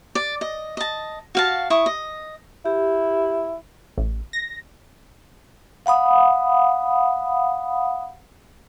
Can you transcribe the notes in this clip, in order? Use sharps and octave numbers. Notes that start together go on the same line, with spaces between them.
D5
D#5
D#5 A5
F#4 F5 A5
E4 C#6 D#6
D#5
E4 G4
A1
A#6
F5 F#5 B5 D#6